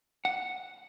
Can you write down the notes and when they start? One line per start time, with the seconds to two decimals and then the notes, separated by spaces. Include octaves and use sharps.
0.25 F#5